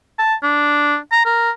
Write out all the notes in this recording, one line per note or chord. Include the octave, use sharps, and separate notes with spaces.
A5
D4
A#5
A#4